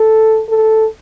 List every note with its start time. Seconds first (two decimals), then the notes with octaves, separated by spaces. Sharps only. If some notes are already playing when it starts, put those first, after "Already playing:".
Already playing: A4
0.49 A4